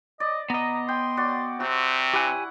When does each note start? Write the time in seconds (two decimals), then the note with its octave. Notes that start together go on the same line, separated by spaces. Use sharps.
0.20 D5 D#5
0.50 B3 D#5 A#5
0.88 G5 C6
1.17 F#4 D5
1.60 C3 C4 F#4
2.14 E4 G4 F#5 G#5